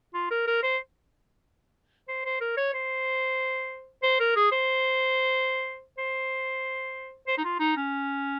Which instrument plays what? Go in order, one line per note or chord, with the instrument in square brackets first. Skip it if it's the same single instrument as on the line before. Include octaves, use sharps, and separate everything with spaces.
[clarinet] F4
A#4
A#4
C5
C5
C5
A#4
C#5
C5
C5
A#4
G#4
C5
C5
C5
D#4
F4
D#4
C#4